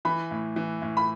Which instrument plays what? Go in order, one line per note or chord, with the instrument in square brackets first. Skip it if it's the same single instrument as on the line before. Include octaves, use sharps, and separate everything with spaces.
[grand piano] E3 [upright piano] B5
[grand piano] A2
E3
A2
[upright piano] B5